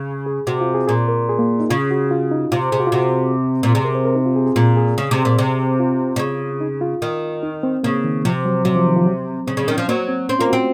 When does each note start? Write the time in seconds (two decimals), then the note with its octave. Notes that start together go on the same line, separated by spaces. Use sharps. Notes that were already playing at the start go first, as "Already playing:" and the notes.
Already playing: C#3
0.26 G#4
0.47 C3 F#4
0.61 F4
0.74 G#4
0.87 A#2 G#4
1.08 A#4
1.29 G#4
1.39 A#3
1.60 D#4
1.70 C#3 F4
1.90 F#4
2.11 F4
2.31 D#4
2.52 C3 F4
2.72 C3 G#4
2.80 F#4
2.87 F4
2.92 C3 F#4
3.63 A#2
3.74 C3 G#4
3.84 A#4
3.95 C5
4.05 A#4
4.15 D#4
4.26 F4
4.36 G#4
4.46 G#4
4.56 A#2 F4
4.77 G#4
4.98 C#3
5.11 C3
5.25 A#2
5.39 C3
5.80 F4
6.16 C3
6.19 C#3
6.61 D#4
6.81 F4
7.02 D#3
7.43 D#4
7.63 C4
7.83 C#3 A#3
8.04 D#3
8.25 C3 F3
8.45 F#3
8.65 C3 F#3
8.76 F3
8.86 D#3
8.96 F3
9.06 F#3
9.47 C#3 C4
9.57 C#3
9.68 D#3 C#4
9.78 F3
9.88 F#3 A#3
10.08 C4
10.29 C4 C#4
10.39 A#3 F4
10.49 F#4
10.53 C4